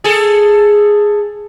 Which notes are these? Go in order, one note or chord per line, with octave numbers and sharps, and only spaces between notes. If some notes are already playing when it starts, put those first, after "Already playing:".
G#4 A4